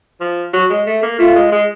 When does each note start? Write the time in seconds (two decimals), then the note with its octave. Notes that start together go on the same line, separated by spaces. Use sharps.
0.21 F3
0.53 F#3
0.70 G#3
0.87 A3
1.03 A#3
1.19 A3 F4
1.36 G#3
1.52 G#3